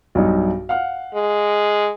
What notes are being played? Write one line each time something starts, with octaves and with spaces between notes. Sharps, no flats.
B1 G2 D#4
F5 F#5 F6
G#3